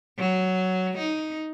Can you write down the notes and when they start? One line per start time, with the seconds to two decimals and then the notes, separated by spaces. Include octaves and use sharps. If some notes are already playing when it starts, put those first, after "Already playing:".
0.19 F#3
0.98 D#4